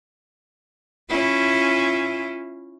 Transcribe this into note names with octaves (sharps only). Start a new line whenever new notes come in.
C#4 E4 F4